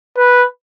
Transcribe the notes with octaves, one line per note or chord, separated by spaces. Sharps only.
B4